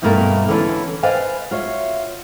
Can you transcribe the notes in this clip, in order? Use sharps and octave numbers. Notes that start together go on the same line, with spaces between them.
E2 G2 B2 A3 A#3 A#4
D3 E3 C#4 A4
B4 C5 D5 D#5 F5 G#5
F4 F#4 C#5 E5